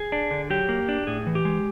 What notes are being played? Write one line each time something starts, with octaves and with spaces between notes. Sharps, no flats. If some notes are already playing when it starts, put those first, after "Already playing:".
Already playing: G#4
D4
D3
F#3 G4
A#3
D4
A2 G#4
E3
G4
G#3